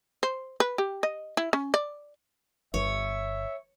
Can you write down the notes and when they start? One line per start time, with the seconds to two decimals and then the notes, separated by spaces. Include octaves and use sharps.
0.23 C5
0.60 B4
0.78 G4
1.03 D#5
1.37 E4
1.53 C#4
1.74 D5
2.74 G1 C#5 E5